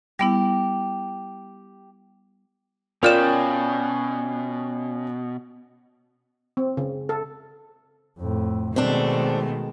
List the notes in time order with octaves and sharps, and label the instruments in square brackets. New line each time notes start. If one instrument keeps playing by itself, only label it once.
[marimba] G3 B3 E4 [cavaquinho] G4
[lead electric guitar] B2 [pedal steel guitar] C#4 G5 [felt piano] F4 D5 [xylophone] A#4 F6 E7
[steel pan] C4
C#3
A4
[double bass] F2 A2
[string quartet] B2 A3 [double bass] D#3 G#3 [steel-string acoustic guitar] C4 D4